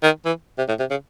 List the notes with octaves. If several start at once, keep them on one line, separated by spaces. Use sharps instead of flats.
D#3
E3
C3
A2
C3
C#3